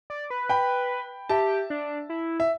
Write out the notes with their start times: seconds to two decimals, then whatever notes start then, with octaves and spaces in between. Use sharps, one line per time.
0.10 D5
0.30 B4
0.49 G5 B5
1.29 G4 E5 A5
1.70 D4
2.09 E4
2.40 E5